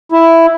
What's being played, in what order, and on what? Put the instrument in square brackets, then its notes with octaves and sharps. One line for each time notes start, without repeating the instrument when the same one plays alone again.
[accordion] E4